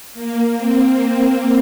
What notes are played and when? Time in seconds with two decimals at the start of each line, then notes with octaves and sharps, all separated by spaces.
0.14 A#3
0.58 C4